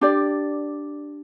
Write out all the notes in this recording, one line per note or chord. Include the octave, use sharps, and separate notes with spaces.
D4 G4 D5